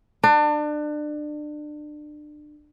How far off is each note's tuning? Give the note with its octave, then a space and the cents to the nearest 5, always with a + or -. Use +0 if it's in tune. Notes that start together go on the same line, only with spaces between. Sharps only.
D4 +30